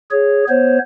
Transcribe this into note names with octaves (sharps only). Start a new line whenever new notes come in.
G#4 C#5
B3 C5 C#5